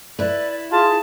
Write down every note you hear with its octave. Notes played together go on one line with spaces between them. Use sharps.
E4 B4 D5
F4 G#4 A5